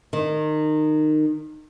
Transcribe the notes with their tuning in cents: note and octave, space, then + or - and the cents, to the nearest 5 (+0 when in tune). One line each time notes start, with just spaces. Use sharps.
D#3 -20